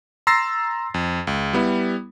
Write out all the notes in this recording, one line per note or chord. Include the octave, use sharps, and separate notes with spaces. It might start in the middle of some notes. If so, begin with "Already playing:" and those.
A#5 C6 E6 A6 A#6 C7
F2
C#2
G3 B3 E4